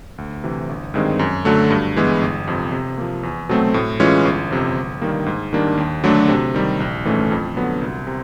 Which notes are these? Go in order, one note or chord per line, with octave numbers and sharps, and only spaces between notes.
D2
C3 E3
G1
G2 D#3 G#3 C4
F#2
D3 F#3 A3
G2
E3 G#3 B3
G1
F2 C3
C3
F3 A#3
E2
B2 F#3 A3 C4
A2
E3 G#3 C#4 F4
G1
F2 C3
G1
G2 D#3 G3 A#3
G#2
D#3 G3 A#3 D4
D#2
D3 F#3 A3 D4
C3
D#3 G3
A#1
G#2 E3 A3 C#4
F2
D3 F#3 B3
C2
C3